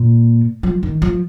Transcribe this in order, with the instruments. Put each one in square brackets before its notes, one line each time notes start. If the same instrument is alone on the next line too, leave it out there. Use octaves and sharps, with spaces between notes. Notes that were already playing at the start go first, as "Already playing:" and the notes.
Already playing: [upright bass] A#2
F3
D#3
F3